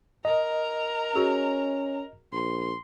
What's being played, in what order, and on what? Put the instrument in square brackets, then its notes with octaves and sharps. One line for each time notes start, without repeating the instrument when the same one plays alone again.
[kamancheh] A#4 A#5 [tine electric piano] D#5
[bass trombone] C#4 [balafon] F#4 G#4
[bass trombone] A#1 [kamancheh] C6